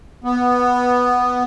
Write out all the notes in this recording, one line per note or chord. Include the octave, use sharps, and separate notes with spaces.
B3